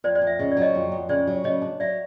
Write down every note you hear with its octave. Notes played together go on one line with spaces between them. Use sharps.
F2 C5 D5
C5 D5
F2
E5
C#3 D#5
D5
F#3
C#5 D#5
F2
F2
C#3 C5 D5
F#3
C#3 C#5 D#5
D4
F#3 D5 E5